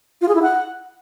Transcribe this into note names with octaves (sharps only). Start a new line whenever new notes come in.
F4
G#4
E4
F#5